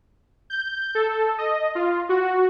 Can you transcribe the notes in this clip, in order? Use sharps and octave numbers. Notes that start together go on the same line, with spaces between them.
G6
A4
D#5
F4
F#4